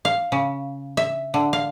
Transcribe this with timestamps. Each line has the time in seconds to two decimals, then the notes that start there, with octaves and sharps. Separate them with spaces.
0.05 F5
0.32 C#3
0.97 E5
1.34 D3
1.53 F5